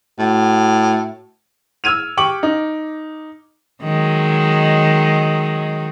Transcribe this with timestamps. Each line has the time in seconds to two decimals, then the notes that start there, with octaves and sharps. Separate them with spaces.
0.19 A2 F#4
1.84 E6 F6 G#6 D#7 F7
2.17 G4 G5 C#6 D6 F#7
2.43 D#4
3.82 D#3 F#3 G#3